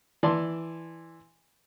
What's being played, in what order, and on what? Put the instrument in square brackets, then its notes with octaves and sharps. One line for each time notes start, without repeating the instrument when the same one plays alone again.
[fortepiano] E3 D5 A5 C6